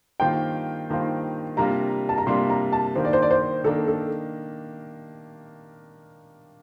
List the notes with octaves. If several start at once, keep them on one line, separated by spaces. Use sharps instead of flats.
G2 D#3 A#3 F4 C5 G5
G2 D#3 A#3 F4 C5
C3 G3 A#3 D4 F4 A#5
A5
A#5
C3 G3 A#3 D4 F4 C6
A#5
A5
D#3 A#3 D4 C5
D5
C5
D5
C5
D#3 A#3 D4 A4
A4